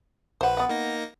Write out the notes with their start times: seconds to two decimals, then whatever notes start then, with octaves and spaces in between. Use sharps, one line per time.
0.41 A#1 B4 C5 F#5
0.57 B3 F#5
0.69 A#3 D#4 A#6